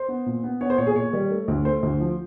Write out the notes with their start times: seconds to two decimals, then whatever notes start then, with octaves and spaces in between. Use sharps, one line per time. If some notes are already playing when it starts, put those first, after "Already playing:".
Already playing: C5
0.08 B3
0.26 A#2
0.43 B3
0.61 B3 C#5
0.70 C5
0.78 A#2 C#5
0.87 G#4
0.96 A#2 C#5
1.13 G3
1.30 A3
1.48 D2
1.65 A3 C5
1.83 D2
2.00 F3